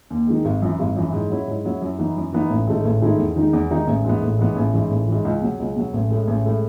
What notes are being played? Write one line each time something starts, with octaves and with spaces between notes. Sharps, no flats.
D#2
D#3 G#3
G#1
F#2 E3
G#1
F#2 E3
G#2
F#3 C#4 E4
G#2
F#3 C#4 E4
F#2
E3 B3 D#4
F#2
E3 B3 D#4
A1
G#2 D#3 A3 E4
A1
G#2 D#3 A3 E4
E2
D#3 G#3 D#4
E2
D#3 G#3 D#4
A1
G#2 E3 B3
A1
G#2 E3 B3
A1
G#2 E3
A1
G#2 E3
C#2
B2 F#3
C#2
B2 F#3
A1
A2 G#3
A1
A2 G#3